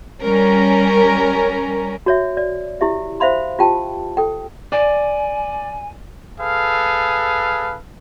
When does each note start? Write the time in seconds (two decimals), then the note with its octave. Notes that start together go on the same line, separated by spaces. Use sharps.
0.21 G3 C#4 A#4
2.06 F#4 C#5 E5
2.37 D5
2.81 E4 G4 E5
3.20 C5 E5 F5 B5 C6
3.59 F4 G4 G5 A5
4.17 A4 G5
4.72 D5 G#5
6.40 G#4 A4 B4 F5